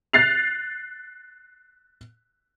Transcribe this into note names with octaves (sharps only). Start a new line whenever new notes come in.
F#6 A6 C7 F7